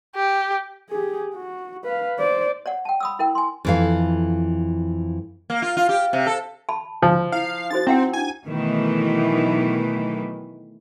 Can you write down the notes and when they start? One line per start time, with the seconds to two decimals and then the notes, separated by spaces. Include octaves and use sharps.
0.16 G4
0.90 G4 G#4
1.35 F#4
1.84 B4 F5
2.19 C5 D5
2.66 C#5 D5 F#5
2.85 G5 A5
3.00 B5 D#6 E6
3.19 E4 A#4 G5
3.35 G#5 C6
3.65 F2 E3 F5
5.50 A#3
5.62 F4
5.77 F4
5.89 G4
6.13 C3
6.26 A4
6.69 A5 B5
7.02 F3
7.32 E4 F5
7.71 D#4 F#4 C5 A6
7.87 C4 E4 F#5 G5
8.13 D4 E4 G#5
8.47 B2 D#3 E3 F#3 A3